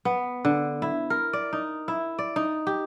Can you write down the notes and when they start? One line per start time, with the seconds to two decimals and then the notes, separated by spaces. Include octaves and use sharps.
0.05 B3
0.45 D3
0.82 E4
1.10 A#4
1.33 D5
1.53 D#4
1.88 E4
2.19 D5
2.36 D#4
2.67 G4